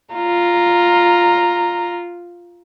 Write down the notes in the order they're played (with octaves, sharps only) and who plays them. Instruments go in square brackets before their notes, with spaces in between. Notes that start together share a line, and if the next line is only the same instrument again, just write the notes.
[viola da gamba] F4 [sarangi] A#5